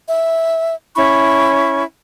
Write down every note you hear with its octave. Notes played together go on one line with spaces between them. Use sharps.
E5
C#4 E4 B5 C#6